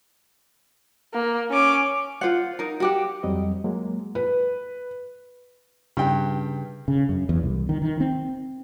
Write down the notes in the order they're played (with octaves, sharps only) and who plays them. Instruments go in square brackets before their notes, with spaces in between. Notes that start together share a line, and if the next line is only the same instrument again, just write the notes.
[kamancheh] A#3
C#4 D6
[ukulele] F4 C5 F#5
D#4 A#4
F#4 G4 F#5
[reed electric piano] F2 F#3 G3 C4 D#5
F#3 G#3 A#3
[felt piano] B4
[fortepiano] G2 G5 [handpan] C#3
[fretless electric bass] C#3
F#2
E2
C2
D#3
D#3
C4